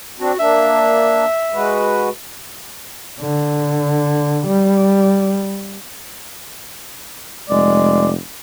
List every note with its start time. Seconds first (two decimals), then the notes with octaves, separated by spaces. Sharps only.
0.19 C4 D4 F#4
0.39 A#3 D4 E5
1.54 G#3 F#4 B4
3.21 D3
4.47 G3
7.50 F1 G#3 D5